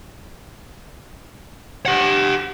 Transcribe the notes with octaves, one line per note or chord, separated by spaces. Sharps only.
G4 F#5